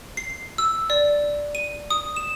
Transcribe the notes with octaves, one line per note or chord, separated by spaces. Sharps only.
C7
E6
D5
D#7
D#6
E7